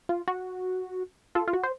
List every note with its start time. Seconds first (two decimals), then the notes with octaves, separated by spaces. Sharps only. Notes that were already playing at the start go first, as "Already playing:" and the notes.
0.09 F4
0.28 F#4
1.35 F4 A4
1.48 F4
1.53 F#4
1.63 C5